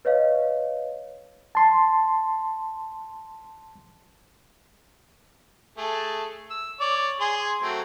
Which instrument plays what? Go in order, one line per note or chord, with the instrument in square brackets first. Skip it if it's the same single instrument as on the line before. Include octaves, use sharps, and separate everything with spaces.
[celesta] B4 C#5 D#5 F5
[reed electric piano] A5 C6
[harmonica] A3 G#4 A5
E6
C#5 D5
G#4 G#5 C6
F#3 A3 C4